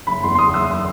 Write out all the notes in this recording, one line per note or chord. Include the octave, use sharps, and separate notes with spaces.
F#1 B5
E2 C6
C6
F#1 D#6
F#1 E6
C6